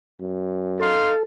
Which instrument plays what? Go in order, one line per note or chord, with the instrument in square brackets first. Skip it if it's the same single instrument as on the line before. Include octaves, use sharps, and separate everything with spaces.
[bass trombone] F#2
[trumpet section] D#4 F5 C6 [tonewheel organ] A4